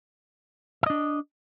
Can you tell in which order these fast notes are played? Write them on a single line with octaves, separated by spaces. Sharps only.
E5 D#5 D4